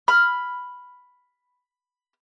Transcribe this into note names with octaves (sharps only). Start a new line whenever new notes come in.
B5 F6